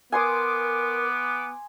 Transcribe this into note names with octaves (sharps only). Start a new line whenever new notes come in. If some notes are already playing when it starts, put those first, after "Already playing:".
B3 A#4 G#5 C6 D6 D#6